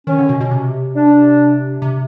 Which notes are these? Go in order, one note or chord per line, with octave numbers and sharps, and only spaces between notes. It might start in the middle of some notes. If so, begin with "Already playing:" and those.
D#3 C#4
D3
B2
B2
C3
D4
C3